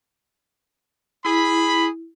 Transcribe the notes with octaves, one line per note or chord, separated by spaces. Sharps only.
E4 G#4 B5